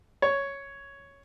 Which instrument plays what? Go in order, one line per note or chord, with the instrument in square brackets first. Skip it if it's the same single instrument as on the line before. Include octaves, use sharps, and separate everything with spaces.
[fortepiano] C#5